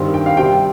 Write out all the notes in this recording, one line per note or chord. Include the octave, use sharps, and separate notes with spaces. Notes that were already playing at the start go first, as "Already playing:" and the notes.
Already playing: G2 D#3 G3 C4
G5
F5
C3 G3 C4 G5